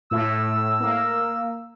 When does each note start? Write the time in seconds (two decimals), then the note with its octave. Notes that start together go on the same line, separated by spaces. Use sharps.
0.11 A2 E6
0.80 A#3